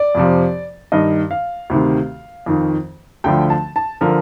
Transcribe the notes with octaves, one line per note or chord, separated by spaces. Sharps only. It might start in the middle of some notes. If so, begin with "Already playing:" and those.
Already playing: D5
F2 C3 F3
G2 D#3 D#5
F5
D2 C3 D#3
F2 D#3
D2 D3 F3 G5
A5
A5
D3 F3 A#4